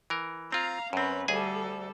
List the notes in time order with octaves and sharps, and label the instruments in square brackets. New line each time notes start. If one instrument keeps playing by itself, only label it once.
[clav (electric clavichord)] E3 A#4
[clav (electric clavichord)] C4 F4 [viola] F5 A#5
[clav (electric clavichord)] F#2 C4 [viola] C#4 B4
[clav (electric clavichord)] D2 G#4 G#5 [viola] G3 A4